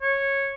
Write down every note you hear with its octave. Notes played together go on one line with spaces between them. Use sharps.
C#5